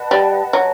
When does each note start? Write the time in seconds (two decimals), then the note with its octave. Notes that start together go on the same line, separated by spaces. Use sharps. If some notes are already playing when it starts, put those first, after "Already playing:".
Already playing: B4 D#5 F#5 A5
0.11 G3
0.53 F#3